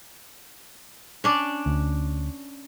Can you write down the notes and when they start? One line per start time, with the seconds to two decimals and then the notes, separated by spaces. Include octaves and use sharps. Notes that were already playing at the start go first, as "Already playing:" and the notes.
1.24 C#4 D4 D5
1.66 D2